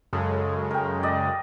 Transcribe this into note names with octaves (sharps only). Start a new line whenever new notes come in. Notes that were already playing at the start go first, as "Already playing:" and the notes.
F#2 C#3 G#3 A4
A#4 G5
D5 D#5